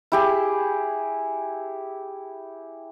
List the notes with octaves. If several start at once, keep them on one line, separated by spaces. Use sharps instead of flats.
E4 G4 G#4